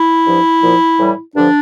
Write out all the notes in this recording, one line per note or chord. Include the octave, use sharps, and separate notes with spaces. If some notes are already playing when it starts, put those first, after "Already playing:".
Already playing: E4
G2 F3
A#2 F3
A2 E3 G3
G2 D3 F3 D4